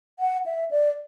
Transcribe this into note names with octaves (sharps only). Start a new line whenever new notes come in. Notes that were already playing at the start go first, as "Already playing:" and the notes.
F#5
E5
D5